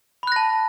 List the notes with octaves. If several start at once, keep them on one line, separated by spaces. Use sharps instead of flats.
A5 B5 F#6 A#6